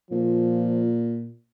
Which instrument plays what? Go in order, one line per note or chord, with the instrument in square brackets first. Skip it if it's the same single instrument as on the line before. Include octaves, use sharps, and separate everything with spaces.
[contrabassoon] A#2 [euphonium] F3